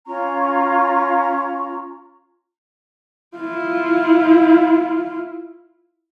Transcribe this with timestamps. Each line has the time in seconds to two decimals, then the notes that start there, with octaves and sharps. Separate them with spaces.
0.06 C#4 F4 A#5 C#6
3.37 E4 F4